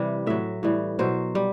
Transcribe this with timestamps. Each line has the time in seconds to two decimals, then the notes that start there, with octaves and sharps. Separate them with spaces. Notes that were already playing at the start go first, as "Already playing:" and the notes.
Already playing: C3 E3 G3
0.27 A2 F#3 E5
0.63 A2 E3 G3
0.99 B2 F#3 C5
1.35 G3